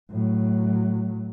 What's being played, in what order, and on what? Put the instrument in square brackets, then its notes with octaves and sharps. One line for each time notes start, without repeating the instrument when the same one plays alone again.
[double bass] A2 F#3